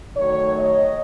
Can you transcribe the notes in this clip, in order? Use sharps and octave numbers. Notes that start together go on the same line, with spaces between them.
D#3 F#3 A3 C#5
D#5